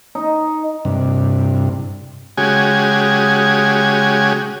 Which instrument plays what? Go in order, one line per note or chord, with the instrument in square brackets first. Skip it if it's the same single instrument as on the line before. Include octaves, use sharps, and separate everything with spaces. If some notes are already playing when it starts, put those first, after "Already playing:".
[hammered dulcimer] D#4
[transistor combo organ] G2 C3
C#3 G#3 F#4 G4 G#5